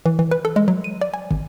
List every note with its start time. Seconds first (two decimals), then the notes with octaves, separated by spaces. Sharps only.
0.06 E3
0.19 E3
0.31 B4
0.45 A4
0.56 G#3
0.68 F#3
0.84 D#7
1.01 D5
1.14 G#5
1.31 G#1